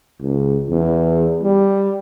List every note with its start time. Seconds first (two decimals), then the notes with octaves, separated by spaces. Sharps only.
0.22 C#2
0.70 E2
1.43 G3